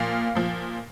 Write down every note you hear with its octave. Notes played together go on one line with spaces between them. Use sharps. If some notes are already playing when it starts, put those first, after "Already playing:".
Already playing: A#2 F3 F5
A#2 F3